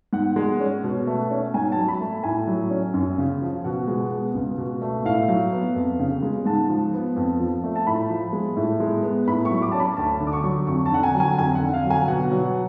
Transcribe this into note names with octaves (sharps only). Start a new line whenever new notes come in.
G#2 F#5
G#3
C#4
B2
A3
C#4
G#2 G#5
F#3 A5
B5
A3
A2 G#5
F#3
C#4
F#2
C#3
F3
B2 F#5
G#3
B3
C#2
B2
A3
A2 F5
F#3
B3
F2
C#3
G#3
G#2 A5
F3
B3
F2
F3
A3
A5
A2 B5
F3
G#3
A2
G#3
B3
A2 B5
C#6
F#3
D6
C#4 A5
B5
D2 A5
D3
D6
C#6
F#3
F2 C#6
A5
D3 F#5
G#5
F#3
G#5
F2 G#5
F#5
D3
F5
F#3
G#5
B2 F#5
F#3